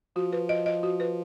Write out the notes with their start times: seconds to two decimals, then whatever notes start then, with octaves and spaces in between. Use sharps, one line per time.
0.16 F3 F#4
0.33 B4
0.49 D#5
0.66 D#5
0.83 F#4
1.00 B4